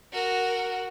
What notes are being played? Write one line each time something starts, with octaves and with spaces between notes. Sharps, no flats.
F#4 A#4